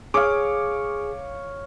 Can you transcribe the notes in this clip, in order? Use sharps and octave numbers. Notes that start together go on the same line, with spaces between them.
G#4 C#5 F5 D6